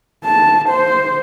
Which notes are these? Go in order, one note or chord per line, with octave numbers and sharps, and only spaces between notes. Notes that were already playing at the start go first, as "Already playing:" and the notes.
A5
C5